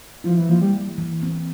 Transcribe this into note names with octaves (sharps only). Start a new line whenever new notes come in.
F3 E4
E3
F3 A#3
G3
E3
E3
C4